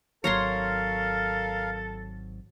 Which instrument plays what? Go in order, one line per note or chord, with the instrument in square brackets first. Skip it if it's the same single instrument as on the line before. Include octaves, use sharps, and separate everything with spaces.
[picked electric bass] G#1 F#3 [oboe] A4 [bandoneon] A#4 F5 [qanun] C#5 A#5 C6